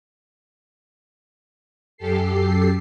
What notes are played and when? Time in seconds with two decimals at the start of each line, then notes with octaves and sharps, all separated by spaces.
1.97 F#2 G4 A4 C7